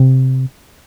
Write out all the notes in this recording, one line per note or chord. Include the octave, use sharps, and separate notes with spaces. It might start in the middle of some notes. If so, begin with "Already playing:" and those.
Already playing: C3